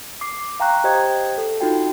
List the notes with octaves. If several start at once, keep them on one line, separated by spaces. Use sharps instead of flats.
D6 C7
F5 G5 A#5 C#6 F#6
G4 C5 D#5 G5 G#6
A4
D#4 F4 F#4 G5